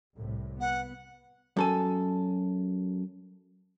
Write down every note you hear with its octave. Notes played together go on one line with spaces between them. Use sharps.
C2 A2
B3 F#5
F#2 A4 G#5